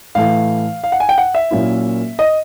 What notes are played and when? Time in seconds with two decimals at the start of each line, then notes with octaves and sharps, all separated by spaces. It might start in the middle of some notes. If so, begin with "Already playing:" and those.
0.15 A2 E3 A3 F5
0.84 F5
0.92 F#5
1.00 G#5
1.09 G5
1.18 F#5
1.35 E5
1.51 A#2 F#3 A#3 C#4 E4
2.19 D#5